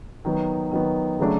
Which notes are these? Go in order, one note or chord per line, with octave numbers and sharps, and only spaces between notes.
D#3 F#3 B3
D#3 F#3 B3
C#3 F#3 A3 D4